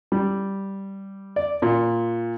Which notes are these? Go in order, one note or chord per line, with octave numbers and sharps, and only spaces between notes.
G3
D5
A#2